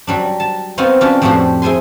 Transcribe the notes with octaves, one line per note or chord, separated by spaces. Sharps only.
F#3 G3 D4
A5
B3 C4 D#4 F4 C#5
F#3 C#4 D4 F4 G4 D5
F2 A2 D4 F#4 G4 C5
E4 G#4 C5 G#5 C6